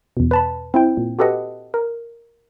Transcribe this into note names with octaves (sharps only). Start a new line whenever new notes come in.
E2 B2
B4 A5 B5
C4 E4 G5
A#2
F#4 G4 A4 B4 D#5 F#5
A#4